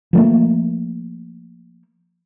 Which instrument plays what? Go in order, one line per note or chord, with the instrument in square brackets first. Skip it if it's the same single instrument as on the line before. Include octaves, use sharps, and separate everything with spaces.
[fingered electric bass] F3 A3 A#3